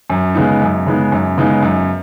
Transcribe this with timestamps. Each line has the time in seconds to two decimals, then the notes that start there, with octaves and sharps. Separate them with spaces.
0.10 F#2
0.35 C#3 G#3 B3 D#4
0.62 F#2
0.86 C#3 G#3 B3 D#4
1.12 F#2
1.37 C#3 G#3 B3 D#4
1.62 F#2